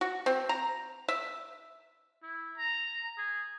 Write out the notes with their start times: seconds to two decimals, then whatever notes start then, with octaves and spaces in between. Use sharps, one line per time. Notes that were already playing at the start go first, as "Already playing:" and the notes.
0.01 F#4
0.26 C4
0.49 A#5
1.08 E5
2.23 E4
2.58 A#5
3.18 G#4